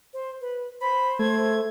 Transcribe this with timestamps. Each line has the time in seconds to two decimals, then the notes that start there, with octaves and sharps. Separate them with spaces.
0.13 C5
0.41 B4
0.81 C5 B5
1.19 A3 G#6